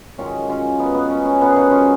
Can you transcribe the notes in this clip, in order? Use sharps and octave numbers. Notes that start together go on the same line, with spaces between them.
F#2 D#3 G#3 C#4 F4
C#4 F4
B3 D#4
B3
C#4
C#4
F#2 F3 G#3 B3 D#4
G#4
D#4 F#4
C#4 F4